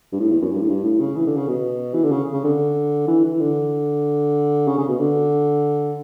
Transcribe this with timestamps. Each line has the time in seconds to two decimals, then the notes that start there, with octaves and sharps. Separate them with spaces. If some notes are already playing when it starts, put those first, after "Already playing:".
0.12 G2
0.20 A2
0.31 E2
0.41 F#2
0.51 G2
0.62 A2
0.69 G2
0.84 A2
1.00 C#3
1.16 E3
1.27 D3
1.37 C#3
1.47 B2
1.94 E3
2.03 D3
2.12 C#3
2.33 C#3
2.44 D3
3.08 E3
3.24 E3
3.40 D3
4.68 C#3
4.78 C#3
4.88 B2
4.99 D3